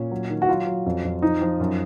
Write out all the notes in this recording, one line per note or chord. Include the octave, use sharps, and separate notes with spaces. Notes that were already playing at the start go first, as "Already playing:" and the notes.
Already playing: A#2 C#4
F#3
D#3
F#4
F#3 F4
F#3
F2
F2
F3 D#4
F3
F#2